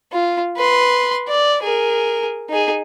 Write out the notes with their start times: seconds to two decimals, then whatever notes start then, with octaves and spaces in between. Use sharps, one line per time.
0.12 F4
0.56 B4 C6
1.28 D5
1.63 G#4 A#4
2.49 D#4 G#4